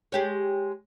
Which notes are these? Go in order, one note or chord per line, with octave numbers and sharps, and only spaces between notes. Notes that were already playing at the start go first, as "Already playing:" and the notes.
G#3 G4 C#5